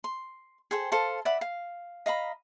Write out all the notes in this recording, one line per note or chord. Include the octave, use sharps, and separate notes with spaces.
C6
G#4 A4 C5 G5
A4 C5 F5 A5
D5 E5 F#5 B5
F5
D#5 F5 A#5 B5